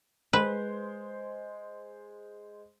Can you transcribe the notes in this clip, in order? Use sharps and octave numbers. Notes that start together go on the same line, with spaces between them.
G#3 B4 C5